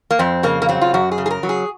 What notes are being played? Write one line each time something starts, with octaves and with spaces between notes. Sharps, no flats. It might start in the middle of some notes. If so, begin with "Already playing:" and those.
A#3
F2 C4
C#3 A#3
A#3
F#3 C4
F4
F#2 F#4
G#4
C#3
G#4
A#4
F#3
G#4